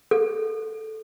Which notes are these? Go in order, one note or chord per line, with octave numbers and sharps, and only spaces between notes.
A4